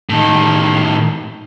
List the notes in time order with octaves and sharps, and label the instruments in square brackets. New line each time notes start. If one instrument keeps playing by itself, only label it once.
[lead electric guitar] A2 D#3